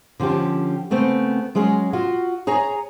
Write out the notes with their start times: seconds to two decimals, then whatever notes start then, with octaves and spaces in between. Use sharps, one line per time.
0.20 D3 F3 C#4 G4
0.91 C#3 A3 B3 C4
1.55 F#3 G#3 C#4 G#4
1.93 F4 F#4
2.47 G#4 C#5 G#5 A#5